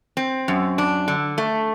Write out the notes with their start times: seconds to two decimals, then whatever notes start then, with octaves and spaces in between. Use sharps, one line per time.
0.17 C4
0.48 F#2
0.78 D4
1.08 D3
1.38 A3